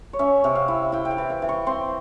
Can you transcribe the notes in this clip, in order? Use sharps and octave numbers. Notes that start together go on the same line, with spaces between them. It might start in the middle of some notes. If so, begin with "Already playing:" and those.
C#5
C#4 E5
C3
F5
E4
E4 G5
G5
F5
E3
F5
E3
C#6
C4 C6